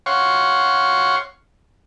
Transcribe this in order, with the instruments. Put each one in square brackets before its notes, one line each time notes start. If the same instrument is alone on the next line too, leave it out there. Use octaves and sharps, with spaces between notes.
[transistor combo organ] C#5 F5 F#5 C6 C#6